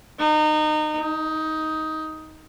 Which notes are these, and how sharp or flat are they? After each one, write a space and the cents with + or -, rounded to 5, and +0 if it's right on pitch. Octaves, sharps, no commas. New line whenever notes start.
D#4 -25
D#4 +15